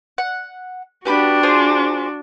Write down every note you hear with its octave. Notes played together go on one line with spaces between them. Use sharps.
F#5
B3 D4 F#4 G4 B5
F4 G#4 C5